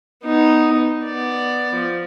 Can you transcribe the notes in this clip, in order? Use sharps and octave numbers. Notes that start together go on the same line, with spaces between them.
B3 D#4
B3 D5
F3